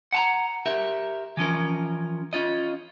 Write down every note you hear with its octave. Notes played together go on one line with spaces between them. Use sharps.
F#5 A5 A#5
G4 A#4 E5
E3 F3 C#4 A#4
C#4 F4 D#5